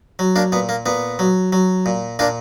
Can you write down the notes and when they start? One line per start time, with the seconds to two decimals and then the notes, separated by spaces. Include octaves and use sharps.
0.19 F#3
0.36 A#3 D4
0.52 A#2 B3
0.69 A#3
0.86 A#2 B3
1.19 F#3
1.53 F#3
1.86 A#2
2.19 A#2 A#3 D4